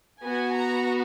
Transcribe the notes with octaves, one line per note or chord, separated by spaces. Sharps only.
B3 F#4 G#5
A#5